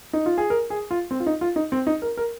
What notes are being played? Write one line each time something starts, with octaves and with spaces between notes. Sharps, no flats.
D#4
F4
G#4
A#4
G#4
F4
C4
F4
D#4
F4
D#4
C4
D#4
A#4
A#4